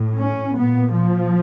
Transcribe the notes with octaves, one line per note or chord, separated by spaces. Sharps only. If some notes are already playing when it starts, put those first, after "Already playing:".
Already playing: A2
C#4
A#2 B3
F3